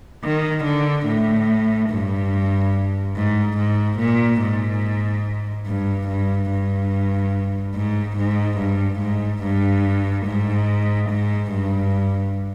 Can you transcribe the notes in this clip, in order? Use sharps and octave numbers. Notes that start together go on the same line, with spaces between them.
D#3
D3
A2
G2
G#2
G#2
A#2
G#2
G2
G2
G2
G#2
G#2
G2
G#2
G2
G#2
G#2
G2